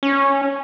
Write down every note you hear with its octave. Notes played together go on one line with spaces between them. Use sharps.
C#4